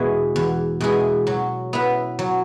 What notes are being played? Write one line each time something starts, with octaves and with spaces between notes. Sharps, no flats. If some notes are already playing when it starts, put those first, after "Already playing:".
Already playing: E2 B2 G#3 E4 G#4
E2
B2 G#3 E4 G#4
F#3
B3 E4 B4
F#3